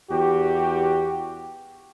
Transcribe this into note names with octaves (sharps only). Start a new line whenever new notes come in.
E2 F#4 G4